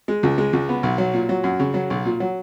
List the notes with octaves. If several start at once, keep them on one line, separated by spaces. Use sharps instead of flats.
G#3
C#2
G#3
C#2
B3
B1
F#3
A#2
F#3
F#2
C#3
F#3
B1
A#2
F#3